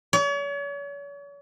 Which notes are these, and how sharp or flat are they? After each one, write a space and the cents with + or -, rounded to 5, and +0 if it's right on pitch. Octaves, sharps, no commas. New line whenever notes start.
C#5 +40